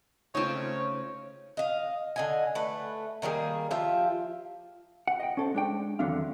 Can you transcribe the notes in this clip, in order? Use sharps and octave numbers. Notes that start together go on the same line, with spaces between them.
C#3 A3 C4 D#4 F4 C#5
D#5 F5
D3 D#5 G#5
A3 B4
D#3 G3 A#3 G#4
F3 F4 G4 E5
F#5
D#5 G5
C#4 A4 C5
G#3 D4 G5
E2 D3 D#3 F#3 C4 F5